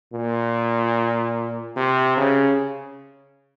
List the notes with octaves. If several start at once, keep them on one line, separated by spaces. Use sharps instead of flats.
A#2
C3
C#3